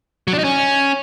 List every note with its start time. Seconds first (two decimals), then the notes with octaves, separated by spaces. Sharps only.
0.28 F#3
0.33 D4
0.39 D#4
0.44 C#4